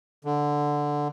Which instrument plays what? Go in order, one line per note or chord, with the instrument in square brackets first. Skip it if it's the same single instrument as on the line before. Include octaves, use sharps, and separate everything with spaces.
[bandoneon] D3